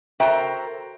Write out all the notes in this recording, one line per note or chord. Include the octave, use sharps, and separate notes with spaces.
F#4 A4 A#4 C5 E5 G5